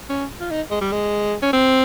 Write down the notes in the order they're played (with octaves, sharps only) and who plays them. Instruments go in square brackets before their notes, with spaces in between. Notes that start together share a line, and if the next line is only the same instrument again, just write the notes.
[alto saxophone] C#4
F4
D#4
G#3
G3
G#3
C#4
C4